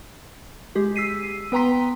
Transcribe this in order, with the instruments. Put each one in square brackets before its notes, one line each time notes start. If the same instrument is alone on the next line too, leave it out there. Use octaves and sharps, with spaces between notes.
[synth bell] G#3 G4 G#4
E6 B6 C7 D#7
B3 B4 G5 A#5 C6 B6